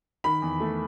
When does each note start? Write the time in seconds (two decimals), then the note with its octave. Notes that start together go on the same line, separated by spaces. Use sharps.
0.24 D#3 B5
0.42 E2
0.60 A3